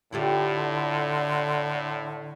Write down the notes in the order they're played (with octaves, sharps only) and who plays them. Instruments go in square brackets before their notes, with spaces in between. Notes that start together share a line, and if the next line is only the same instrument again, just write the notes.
[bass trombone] A2 [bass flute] D3 [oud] E4 F4 G4